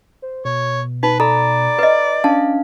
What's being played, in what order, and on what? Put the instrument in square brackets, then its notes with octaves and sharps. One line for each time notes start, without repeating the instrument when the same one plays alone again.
[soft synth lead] C5
[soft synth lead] B2 [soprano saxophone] C#5
[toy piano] D#4 [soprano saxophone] B4
[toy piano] A4 [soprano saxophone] D5 [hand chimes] A#5 B5
[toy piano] B4 D#5
[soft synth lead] C#4 [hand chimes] D4 F5 [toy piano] A5